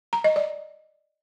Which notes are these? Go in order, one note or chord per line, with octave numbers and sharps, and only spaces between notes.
A#5
D#5
D5